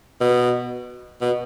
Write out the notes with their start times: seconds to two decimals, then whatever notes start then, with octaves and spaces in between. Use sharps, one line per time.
0.21 B2
1.21 B2